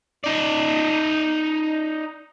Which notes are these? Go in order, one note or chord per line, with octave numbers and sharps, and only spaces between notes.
D#4 D5